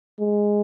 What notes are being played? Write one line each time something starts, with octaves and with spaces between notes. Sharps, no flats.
G#3